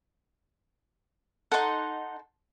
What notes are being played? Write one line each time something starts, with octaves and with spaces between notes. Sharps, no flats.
D#4 A4 F#5 C6